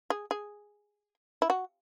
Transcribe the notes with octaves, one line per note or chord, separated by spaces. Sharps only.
G#4
G#4
E4
F#4